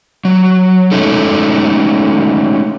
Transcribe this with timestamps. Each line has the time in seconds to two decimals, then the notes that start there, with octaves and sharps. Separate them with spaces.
0.25 F#3
0.92 G#3 A3 C#4 D#4 A4